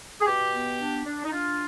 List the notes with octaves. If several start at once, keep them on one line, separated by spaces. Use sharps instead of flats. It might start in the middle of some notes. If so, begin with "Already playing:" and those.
G#4
B2 G4
B3
D4
D4
D#4
D4 F4